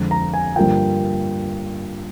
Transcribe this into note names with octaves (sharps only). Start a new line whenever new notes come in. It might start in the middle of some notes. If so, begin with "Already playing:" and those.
Already playing: F2 D3 G#3
A#5
G#5
G2 D3 F3 A#3 F4 G5